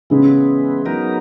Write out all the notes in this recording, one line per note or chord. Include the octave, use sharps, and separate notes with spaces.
C#3 E3 G#3 B3
F#3 B3 D#4 A#4